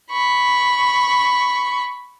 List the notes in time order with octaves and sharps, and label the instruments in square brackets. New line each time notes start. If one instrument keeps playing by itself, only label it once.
[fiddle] B5 C#6